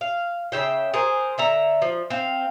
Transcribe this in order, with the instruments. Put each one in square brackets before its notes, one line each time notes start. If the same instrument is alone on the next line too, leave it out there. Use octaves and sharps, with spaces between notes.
[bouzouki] F5
C#3 E5 G5
G#4 A#4 C5
D3 E5 A#5
F3
C4 F5